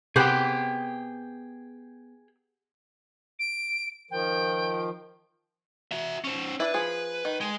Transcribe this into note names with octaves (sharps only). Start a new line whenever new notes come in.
C3 B3 G4 G#4 C5 G5
D7
D#3 F3 G5
F#4 E5
C#4 C5
D4 E4 B4
F3 G#4
D#3
G#3